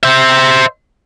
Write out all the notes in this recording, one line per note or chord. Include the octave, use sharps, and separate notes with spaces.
C5 E5